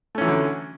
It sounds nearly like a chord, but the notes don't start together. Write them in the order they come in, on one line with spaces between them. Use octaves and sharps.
A3 C#4 E3 F#3 D3